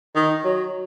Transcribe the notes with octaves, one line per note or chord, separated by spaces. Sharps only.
D#3
F#3